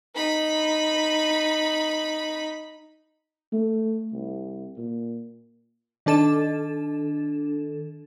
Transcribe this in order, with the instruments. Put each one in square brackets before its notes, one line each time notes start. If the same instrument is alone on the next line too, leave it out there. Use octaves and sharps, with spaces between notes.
[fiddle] D#4 B5
[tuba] A3
C2
A#2
[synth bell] D#3 D4 A4 A6 E7